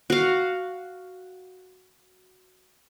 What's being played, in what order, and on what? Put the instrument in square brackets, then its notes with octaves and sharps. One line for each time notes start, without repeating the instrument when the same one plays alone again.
[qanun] F#4 F5